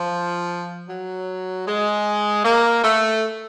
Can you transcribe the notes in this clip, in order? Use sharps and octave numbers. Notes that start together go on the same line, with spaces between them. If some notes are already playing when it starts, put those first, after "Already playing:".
Already playing: F3
F#3
G#3
A#3
A3